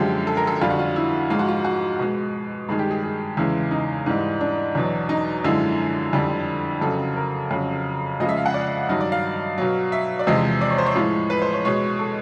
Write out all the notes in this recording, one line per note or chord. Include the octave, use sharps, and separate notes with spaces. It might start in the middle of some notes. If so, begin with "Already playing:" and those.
Already playing: F#2 D3 F3 G#3 G4
A4
A#4
A4
F2 D3 G3 F4
F#4
F4
E4
G#2 F3 G#3 F4
F#4
F4
F#4
B2 G#3
G2 D#3 G#3 G#4
G4
G#4
G#4
E2 C#3 E3 G#3 E4
D#4
G#2 E3 G3
D4
E2 B2 F#3 D4
D#4
F#2 D3 F3 G#3 E4
F2 D3 G3
F2 C#3 F#3 A4
A#4
F2 C#3 F#3
F2 C#3 F3 G#3 D#5
E5
F5
F#5
D5
G2 D#3 F#3 D#5
D5
F5
B2 F#3
E5
D5
E2 C3 F3 G#3 D#5
D5
C#5
C5
C#5
A2 F3 G#3
B4
C5
C#5
B2 G#3 C#5
A4